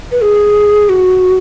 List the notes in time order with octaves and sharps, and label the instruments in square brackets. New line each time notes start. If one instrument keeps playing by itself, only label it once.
[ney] B4
G#4
F#4